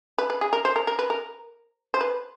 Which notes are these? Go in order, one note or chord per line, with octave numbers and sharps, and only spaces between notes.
B4
B4
G#4
A#4
C5
A#4
A#4
B4
A#4
C5
B4